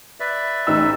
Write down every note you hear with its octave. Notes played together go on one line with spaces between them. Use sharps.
B4 D5 E5
A1 D#4 E6